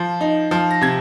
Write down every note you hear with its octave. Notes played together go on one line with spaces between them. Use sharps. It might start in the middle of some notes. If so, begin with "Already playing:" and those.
Already playing: F3
D#4
F3
A#6
C3 G#6